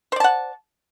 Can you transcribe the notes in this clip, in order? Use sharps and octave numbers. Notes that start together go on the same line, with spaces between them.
C5 D5 F#5 A5